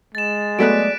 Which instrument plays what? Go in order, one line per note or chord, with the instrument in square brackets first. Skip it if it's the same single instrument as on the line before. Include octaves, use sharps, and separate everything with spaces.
[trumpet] G#3 [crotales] A6 E7
[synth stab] F#3 A3 B3 [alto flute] D5 [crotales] F#6 B6 D7